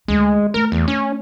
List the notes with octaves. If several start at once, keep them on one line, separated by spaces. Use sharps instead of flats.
D2 G#3
A3 A#4
E2
C#4